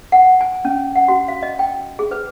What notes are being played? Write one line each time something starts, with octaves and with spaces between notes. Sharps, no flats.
F#5
G#5
C#4
F#5
F#4
F5
D#5
G5
G#4
B4